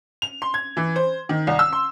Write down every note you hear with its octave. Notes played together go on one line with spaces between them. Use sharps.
F7
C6
G#6
E3
C5
D#3
C2
E6
C6